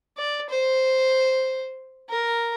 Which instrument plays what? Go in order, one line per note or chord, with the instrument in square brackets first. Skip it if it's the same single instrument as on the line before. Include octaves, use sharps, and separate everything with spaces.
[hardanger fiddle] D5
C5
A#4